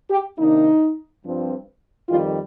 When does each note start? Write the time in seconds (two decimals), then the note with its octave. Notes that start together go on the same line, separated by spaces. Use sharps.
0.10 G4
0.39 C3 D#3 A#3 D4 D#4
1.23 G2 F3 C4
2.09 F2 D#3 G3 F4